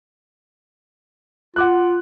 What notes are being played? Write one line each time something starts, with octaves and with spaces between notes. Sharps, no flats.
F4 F#5 D6 F#6